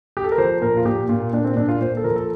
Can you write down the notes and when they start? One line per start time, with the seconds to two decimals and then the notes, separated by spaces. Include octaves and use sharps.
0.17 G4
0.24 A4
0.32 A#4
0.38 F3 C5
0.62 A#2 A#4
0.77 F4
0.85 A#2 G4
1.09 A#2 F4
1.33 A#2 D4
1.44 C4
1.57 A#2 D4
1.69 F4
1.81 A#2 C5
1.97 A4
2.04 F3 A#4
2.16 A4